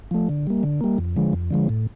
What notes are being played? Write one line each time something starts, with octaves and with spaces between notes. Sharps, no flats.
F3 A3
D3
G3 A#3
D3
G3 A#3
F2
D3 F3 G#3
F2
D3 F3 G#3
A2